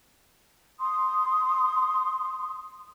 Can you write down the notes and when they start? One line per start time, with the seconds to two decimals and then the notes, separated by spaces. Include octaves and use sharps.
0.80 C6 D#6